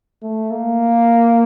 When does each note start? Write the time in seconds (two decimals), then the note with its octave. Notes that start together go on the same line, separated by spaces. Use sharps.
0.22 A3
0.51 A#3